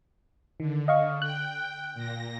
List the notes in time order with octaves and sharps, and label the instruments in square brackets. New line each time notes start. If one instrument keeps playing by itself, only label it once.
[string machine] D3 [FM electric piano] D#3
[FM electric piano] D#5 F5 C#6
[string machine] G5 [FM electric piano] F#6
[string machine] A#2 A#6